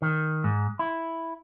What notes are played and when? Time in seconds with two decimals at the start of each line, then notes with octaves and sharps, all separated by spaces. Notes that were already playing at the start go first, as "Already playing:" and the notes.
0.02 D#3
0.44 G#2
0.79 E4